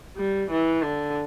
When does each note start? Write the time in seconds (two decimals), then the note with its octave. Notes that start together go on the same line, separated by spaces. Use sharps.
0.17 G3
0.51 E3
0.83 D3